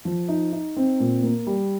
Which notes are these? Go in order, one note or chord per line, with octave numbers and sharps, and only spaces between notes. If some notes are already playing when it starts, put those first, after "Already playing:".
F3
D#4
D#4
C4
A#2
A#3
G3